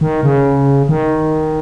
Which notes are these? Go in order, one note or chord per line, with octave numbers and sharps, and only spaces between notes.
D#3
C#3
D#3